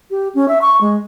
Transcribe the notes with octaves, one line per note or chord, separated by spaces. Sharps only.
G4
C#4
E5
C#6
G#3